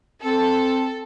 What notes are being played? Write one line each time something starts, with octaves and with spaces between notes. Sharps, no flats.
C4 A4